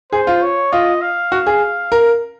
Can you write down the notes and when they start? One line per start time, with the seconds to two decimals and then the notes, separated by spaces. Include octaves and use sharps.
0.12 G#4 C5
0.27 F4
0.43 C#5
0.72 F4 D#5
1.02 F5
1.32 F#4
1.47 G#4
1.92 A#4